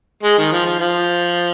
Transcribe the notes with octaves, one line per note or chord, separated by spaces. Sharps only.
G#3
D#3
F3
F3
F3